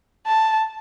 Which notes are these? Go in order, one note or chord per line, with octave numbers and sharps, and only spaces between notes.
A5